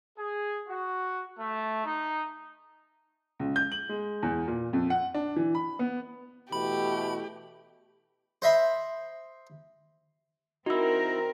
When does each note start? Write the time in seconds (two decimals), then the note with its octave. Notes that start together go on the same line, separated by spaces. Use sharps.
0.17 G#4
0.68 F#4
1.39 A3
1.85 D#4
3.39 C#2
3.56 G6
3.72 F#7
3.89 G#3
4.23 E2
4.48 A#2
4.73 F2
4.90 F#5
5.14 D4
5.36 E3
5.55 B5
5.79 B3
6.52 B2 E3 A3 G4 B5
8.42 C5 D#5 E5 B5
10.66 C4 D#4 E4 F#4 A#4 E6